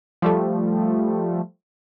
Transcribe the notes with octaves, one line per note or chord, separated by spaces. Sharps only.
F3 G3 A3